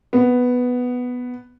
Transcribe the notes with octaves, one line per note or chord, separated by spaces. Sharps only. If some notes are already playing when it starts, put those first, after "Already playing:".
B3